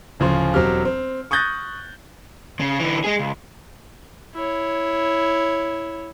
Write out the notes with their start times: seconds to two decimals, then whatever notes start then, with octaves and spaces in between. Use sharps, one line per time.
0.20 D1 C#3 F3 C6
0.54 E1 F#3 C4 G4 F6
0.85 C4
1.31 C#6 D#6 F#6 G6 A6 A#6
2.60 C#3
2.80 D3 E3
3.04 G#3 G#4
3.19 C#2
4.35 E4 C#5